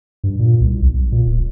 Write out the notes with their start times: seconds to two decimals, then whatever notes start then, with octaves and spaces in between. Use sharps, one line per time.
0.24 G2
0.39 A#2
0.61 C2
0.82 B1
1.12 A#2
1.26 D1